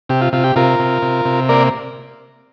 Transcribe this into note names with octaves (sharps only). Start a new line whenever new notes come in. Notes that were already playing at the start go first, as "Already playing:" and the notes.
C3 G4
F4
C3 F4
G4
C3 F4 A#4
C3
C3
C3
A#3 A#4 D5